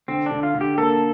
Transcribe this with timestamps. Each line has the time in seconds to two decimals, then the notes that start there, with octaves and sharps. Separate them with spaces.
0.08 D3 C4
0.26 D3 D4
0.43 F4
0.54 D3
0.61 G4
0.78 A#3 A4